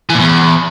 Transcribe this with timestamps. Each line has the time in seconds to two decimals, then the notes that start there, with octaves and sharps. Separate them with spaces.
0.10 E3
0.15 A#2
0.20 E2